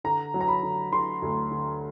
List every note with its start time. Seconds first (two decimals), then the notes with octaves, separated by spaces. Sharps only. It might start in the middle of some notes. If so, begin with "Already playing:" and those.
0.04 D3 A#5
0.34 F#3
0.41 A#5
0.48 B5
0.63 D3
0.92 D3 C6
1.22 D2
1.51 D3